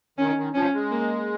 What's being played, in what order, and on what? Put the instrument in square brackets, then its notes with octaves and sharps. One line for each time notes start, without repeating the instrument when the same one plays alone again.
[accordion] D#3 [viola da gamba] C#4
[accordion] D#3
[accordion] F3 [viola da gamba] C#4
[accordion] G#3
[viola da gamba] A#3